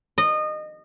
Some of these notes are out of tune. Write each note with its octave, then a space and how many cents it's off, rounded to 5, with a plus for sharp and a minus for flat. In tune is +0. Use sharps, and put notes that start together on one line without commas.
D#5 -25